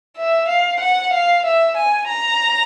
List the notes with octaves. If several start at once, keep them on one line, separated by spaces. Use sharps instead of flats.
E5
F5
F#5
F5
E5
G#5
A#5